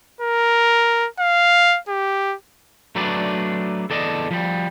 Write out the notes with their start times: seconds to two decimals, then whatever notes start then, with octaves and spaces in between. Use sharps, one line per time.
0.21 A#4
1.19 F5
1.88 G4
2.96 F#3 A3 D4 B4 D5
3.90 E2 A4 D5 D#5 F5 A5
4.31 F3 G3